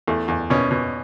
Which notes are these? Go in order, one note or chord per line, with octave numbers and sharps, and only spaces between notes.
E2 A3
E2
B2 C#4
B2